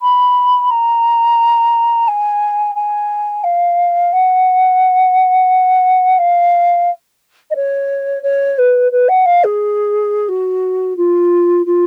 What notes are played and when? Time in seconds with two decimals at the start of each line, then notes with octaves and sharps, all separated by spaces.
0.02 B5
0.70 A#5
2.08 G#5
2.75 G#5
3.44 F5
4.12 F#5
6.18 F5
7.50 D#5
7.55 C#5
8.23 C#5
8.58 B4
8.91 B4
9.08 F#5
9.25 F5
9.44 G#4
10.28 F#4
10.96 F4
11.66 F4